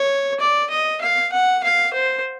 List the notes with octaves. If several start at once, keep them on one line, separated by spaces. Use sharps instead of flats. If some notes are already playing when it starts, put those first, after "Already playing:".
Already playing: C#5
D5
D#5
F5
F#5
F5
C5